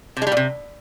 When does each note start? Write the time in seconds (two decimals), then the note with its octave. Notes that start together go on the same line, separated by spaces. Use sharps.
0.17 C3
0.22 G#3
0.27 G3
0.32 A#2
0.37 C3